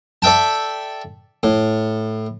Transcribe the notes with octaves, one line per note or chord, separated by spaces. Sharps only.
A4 D5 E5 G5 A5
A2